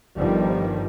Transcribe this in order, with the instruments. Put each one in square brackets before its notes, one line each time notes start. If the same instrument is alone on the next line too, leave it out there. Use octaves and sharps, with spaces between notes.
[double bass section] G1 D#3 F3 G3